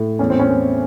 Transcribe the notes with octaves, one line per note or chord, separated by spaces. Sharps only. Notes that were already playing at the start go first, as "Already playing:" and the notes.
Already playing: A2
E2 C#4
C4
C#4
E2